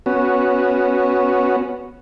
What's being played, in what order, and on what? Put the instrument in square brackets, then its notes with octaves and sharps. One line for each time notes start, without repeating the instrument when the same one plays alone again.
[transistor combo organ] B3 C#4 F#4